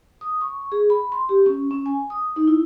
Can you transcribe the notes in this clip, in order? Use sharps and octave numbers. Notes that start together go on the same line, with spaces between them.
D#6
C#6
G#4
B5
C6
G4
C#4
C#4
G#5
D#6
D#4
E4